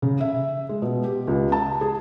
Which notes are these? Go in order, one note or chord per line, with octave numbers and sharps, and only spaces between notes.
C#3
E5
G#3
B2
G4
C#2
A5
G#4